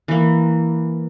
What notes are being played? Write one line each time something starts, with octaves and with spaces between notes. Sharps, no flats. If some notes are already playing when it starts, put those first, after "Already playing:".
E3 A#3